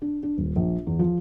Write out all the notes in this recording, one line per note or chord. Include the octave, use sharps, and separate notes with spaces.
D4
D4
D#1
A#1
E2
F3